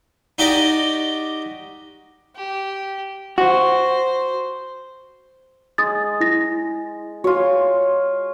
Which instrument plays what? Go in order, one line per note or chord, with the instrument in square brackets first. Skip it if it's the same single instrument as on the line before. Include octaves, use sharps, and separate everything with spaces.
[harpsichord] D#4 F#4 G4 D5 D#5
[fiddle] G4
[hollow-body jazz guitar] F#4 [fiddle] C5
[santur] G#3 [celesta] D#6 A6
[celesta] E4 A#6
[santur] F4 C#5 [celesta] F#4